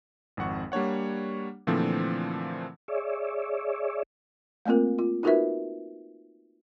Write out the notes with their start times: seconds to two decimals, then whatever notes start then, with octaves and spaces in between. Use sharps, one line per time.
0.37 G#1 F2 F#5 C#6
0.72 G3 A#3 D4 C#5 F#5
1.67 A#2 D3 E3 F3 A3 C4
2.88 G#4 C#5 D5 E5
4.66 A3 A#3 C4 F4 A#4
4.99 F4
5.23 D#4 F4 F#4 A#4 B4 E5